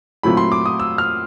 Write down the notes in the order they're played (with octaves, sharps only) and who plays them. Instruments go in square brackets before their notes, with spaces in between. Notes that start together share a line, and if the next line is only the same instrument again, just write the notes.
[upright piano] A#2 F#3 A3 C4 E4 [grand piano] B5
[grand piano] C6
D6
D#6
E6
F6